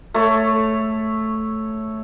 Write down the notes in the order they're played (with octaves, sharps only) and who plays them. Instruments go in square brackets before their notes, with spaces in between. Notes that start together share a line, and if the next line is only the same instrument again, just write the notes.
[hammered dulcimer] A3 C#5